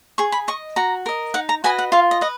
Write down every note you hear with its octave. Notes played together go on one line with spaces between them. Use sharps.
G#4 C#6
B5
D#5 C#6
F#4 A#5
A#4 D#5
D#4 F#5
A#5
F#4 B4 D#5 G#5
F#5
F4 F5
D#5
B4 D#5